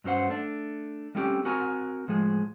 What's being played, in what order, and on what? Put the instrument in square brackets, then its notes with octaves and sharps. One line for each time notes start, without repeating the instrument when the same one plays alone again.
[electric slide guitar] G2 F#3 C#4 C5 F#5
A3 D4
G3 A3 C4 C#4 F4 G4
C4 F#4 A#4 G#5 A#5
A2 F3 G#3 G#4